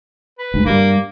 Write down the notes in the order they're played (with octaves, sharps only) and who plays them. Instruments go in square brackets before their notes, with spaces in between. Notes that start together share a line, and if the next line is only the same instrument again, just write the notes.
[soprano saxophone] B4
[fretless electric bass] D2 G#2
[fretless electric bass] G2 G3 [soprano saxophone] A#3